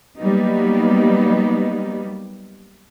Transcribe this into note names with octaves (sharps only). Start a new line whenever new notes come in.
F#3 G3 A#3 B3 D#4